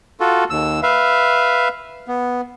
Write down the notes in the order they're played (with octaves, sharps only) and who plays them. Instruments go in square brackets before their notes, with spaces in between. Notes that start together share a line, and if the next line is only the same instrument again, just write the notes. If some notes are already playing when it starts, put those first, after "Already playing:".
[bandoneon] F4 F#4 A4
D#2 E6
B4 E5 F5
B3